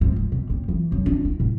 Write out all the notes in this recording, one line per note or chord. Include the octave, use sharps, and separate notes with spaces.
G#2
G#2
B2
F#1
E3
F#2
D4
E4
A2